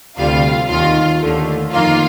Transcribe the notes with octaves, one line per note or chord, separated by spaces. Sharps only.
D2 C3 G3 F4 F5
D#2 D#3 A#3 F4 F5
D#2 D3 A3
F2 D#3 A#3 F4 F5